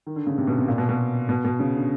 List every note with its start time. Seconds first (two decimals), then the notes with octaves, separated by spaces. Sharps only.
0.06 D#3
0.16 D3
0.27 C#3
0.38 C3
0.47 B2
0.58 C3
0.68 A#2
0.78 B2
0.89 B2
1.29 B2
1.45 B2
1.59 C#3
1.76 D3